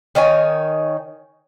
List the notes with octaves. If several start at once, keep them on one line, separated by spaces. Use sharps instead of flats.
D#3 D#4 C#5 G#5